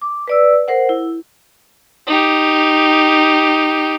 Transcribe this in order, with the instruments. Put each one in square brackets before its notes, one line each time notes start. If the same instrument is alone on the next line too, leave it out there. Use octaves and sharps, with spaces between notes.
[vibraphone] D6
B4 D5 E6
A#4 C5 F#5
E4
[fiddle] D#4 G4